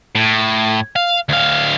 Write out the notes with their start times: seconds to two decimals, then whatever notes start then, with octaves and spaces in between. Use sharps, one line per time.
0.15 A2
0.96 F5
1.29 D2 F5